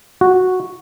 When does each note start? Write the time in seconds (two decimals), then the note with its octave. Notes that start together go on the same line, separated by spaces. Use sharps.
0.21 F#4